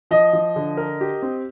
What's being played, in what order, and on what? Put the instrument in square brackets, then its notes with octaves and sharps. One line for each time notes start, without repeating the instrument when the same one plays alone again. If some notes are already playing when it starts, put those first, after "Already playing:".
[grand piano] F3 [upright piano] D#5
[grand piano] F3
D3
A#4
G4
C4